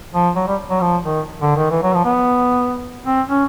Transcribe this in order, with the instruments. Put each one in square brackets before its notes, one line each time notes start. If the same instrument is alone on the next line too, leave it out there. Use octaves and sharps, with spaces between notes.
[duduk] F3
F#3
G3
F#3
F3
D#3
D3
D#3
E3
F#3
F3
B3
C4
C#4